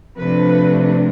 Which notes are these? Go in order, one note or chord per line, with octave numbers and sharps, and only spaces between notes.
C3 F3 A3 D4 B4